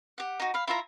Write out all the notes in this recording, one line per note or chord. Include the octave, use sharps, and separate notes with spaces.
G4 F#5
D#4 F#4
F5 B5
E4 F4 E5 A#5